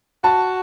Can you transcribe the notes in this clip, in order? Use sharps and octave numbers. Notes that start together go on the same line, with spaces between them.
F#4 A5